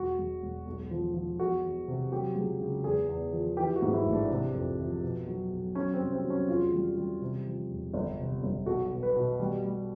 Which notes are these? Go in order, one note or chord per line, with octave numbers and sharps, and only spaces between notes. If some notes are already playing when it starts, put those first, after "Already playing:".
Already playing: E1 F#4
E1
E1
B1
F3
F3
E2 F#4
E2
C3
F#3 G4
C#2
C#3
E2 G#4
E2
F3
E3 G4
F#4
G#2
E4
A1
D4
C3
F2
F3
B2
F#3
B1
F#3 C#4
C4
C2
C4
F#3
C#4
E2 F4
G3
G3
C3
F3
E1
G1
C3
G1
B1 F#4
B2
B4
B2
G3
G3